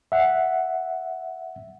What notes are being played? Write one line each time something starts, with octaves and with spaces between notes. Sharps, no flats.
E5 F#5